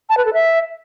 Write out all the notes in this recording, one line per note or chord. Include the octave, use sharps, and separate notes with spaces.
A5
B4
A4
E5